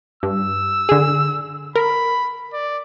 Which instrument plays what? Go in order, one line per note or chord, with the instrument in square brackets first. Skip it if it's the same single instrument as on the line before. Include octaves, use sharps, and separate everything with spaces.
[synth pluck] G2 [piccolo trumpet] E6
[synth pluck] D3 G#4
[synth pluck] A#4 [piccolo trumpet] B5
[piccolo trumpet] D5